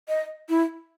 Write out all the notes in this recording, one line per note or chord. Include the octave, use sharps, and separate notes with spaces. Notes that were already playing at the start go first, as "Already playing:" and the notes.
D#5
E4